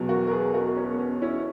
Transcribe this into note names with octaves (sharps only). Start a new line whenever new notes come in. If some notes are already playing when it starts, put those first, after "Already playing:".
Already playing: E2 B2 F#3
F#4 A#4
A#4
G#4 B4
F#4 A#4
C#4
B3
C#4
C#4 E4